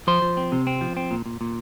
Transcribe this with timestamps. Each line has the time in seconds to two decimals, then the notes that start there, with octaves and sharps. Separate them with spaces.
0.07 F3 C5
0.22 F3
0.37 C4
0.52 C3
0.67 C4
0.81 F3
0.97 C4
1.11 A#2
1.26 A#2
1.41 A#2